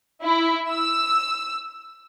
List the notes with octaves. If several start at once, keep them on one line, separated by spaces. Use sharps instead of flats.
E4
E6